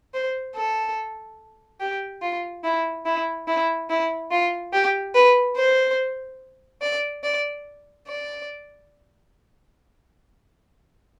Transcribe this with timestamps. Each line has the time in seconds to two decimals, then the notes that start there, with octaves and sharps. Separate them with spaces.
0.13 C5
0.55 A4
1.80 G4
2.22 F4
2.64 E4
3.06 E4
3.48 E4
3.90 E4
4.31 F4
4.73 G4
5.15 B4
5.56 C5
6.82 D5
7.23 D5
8.07 D5